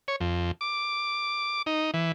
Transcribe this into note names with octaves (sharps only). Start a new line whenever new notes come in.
C#5
F2
D6
D#4
E3